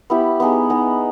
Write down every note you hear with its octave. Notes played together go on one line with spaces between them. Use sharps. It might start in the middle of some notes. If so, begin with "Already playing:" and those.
B3 E4 G4
B3 D#4 G#4
B3 D#4 G#4